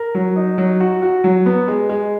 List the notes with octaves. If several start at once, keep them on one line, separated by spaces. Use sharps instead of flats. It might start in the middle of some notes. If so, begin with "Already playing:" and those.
Already playing: A#4
F#3
D#4
F#3
F#4
F#4
F#3
B3
G#3
G#3